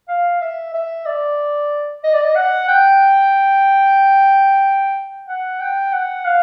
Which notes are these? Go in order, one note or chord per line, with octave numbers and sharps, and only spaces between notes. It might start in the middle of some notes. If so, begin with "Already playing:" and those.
F5
E5
E5
D5
D#5
D5
D#5
F#5
G5
F#5
G5
F#5
F5